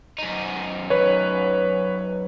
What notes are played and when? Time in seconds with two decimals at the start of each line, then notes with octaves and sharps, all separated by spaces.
0.18 F#2 D#4
0.90 B4 C#5